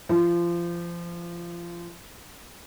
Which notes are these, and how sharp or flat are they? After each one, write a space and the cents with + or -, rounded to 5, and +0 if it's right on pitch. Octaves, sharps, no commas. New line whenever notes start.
F3 -25